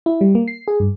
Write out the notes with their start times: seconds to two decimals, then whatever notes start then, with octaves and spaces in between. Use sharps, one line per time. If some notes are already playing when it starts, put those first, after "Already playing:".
0.06 E4
0.21 G3
0.35 A#3
0.48 C7
0.68 G#4
0.80 G2